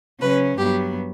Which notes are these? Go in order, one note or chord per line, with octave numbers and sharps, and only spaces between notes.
C#3 F#3 C#4 B4
G2 F#3 B3 G4